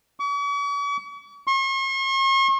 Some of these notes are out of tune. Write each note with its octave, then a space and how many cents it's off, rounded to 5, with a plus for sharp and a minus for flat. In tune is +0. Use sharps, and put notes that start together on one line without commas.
C#6 +45
C#6 -45